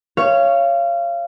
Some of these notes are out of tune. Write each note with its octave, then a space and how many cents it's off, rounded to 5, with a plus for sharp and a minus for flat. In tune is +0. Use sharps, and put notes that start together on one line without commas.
C#5 +0 F5 -25